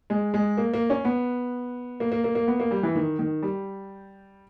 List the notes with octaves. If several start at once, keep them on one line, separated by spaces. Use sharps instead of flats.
G#3
G#3
A#3
A#3
C#4
B3
A#3
A#3
A#3
A#3
B3
A#3
G3
E3
D#3
D#3
G3